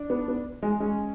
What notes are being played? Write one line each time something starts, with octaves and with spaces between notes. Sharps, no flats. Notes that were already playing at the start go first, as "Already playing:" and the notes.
Already playing: D4
B3
B3
G#3
G#3 C#4